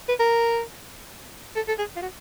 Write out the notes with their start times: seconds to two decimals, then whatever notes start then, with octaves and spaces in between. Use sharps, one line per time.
0.09 B4
0.20 A#4
1.56 A4
1.68 A4
1.79 G#4
1.96 F4
2.02 F#4